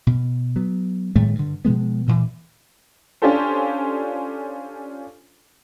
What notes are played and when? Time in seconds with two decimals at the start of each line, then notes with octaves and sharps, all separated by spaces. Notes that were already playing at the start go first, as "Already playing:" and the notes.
0.07 B2
0.56 F#3 B3
1.16 A2 D#3 G#3 A3
1.35 G2 D3
1.65 B2 F3 G#3 B3
2.07 D2 A#2 D#3 E3
3.22 C#4 D4 F4 G4 A4 C5